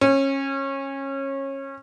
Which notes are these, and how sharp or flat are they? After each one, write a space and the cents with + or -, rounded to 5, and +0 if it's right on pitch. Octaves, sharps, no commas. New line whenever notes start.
C#4 -25